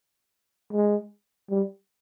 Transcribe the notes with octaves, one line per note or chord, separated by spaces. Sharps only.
G#3
G3